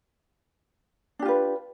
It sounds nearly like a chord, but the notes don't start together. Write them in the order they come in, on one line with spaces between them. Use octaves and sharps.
D4 G4 F4 B4